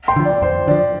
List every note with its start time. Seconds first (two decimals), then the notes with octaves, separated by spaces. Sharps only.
0.08 G5 C6
0.16 D3 F3
0.25 D5
0.42 F2 C5
0.67 D3 D5
0.71 F3